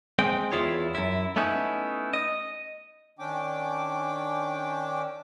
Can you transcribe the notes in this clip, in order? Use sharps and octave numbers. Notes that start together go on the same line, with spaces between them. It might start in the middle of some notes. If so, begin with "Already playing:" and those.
G#3 C4 G5
E2 D#3 E4 F4 G#4 C#5
F#2 E4
A3 B3 C#4 D#4 E4
D#5
D#3 C#4 D4 G5 D6